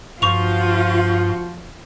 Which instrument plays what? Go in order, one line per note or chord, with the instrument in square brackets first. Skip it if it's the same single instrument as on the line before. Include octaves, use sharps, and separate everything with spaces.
[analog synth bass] G2 [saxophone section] F3 [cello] F4 F#4 [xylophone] C#6 F7